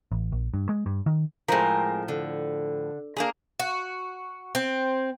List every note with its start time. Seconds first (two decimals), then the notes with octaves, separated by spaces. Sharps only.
0.12 A1
0.32 A#1
0.54 G2
0.69 G#3
0.86 G2
1.06 D#3
1.48 A2 F3 G#3 C4 A#4
2.08 D3
3.17 A#3 D4 G#4 A#5
3.59 F#4
4.55 C4